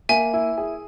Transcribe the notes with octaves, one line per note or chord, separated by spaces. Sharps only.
A#3 E5 G#5
E4
G#4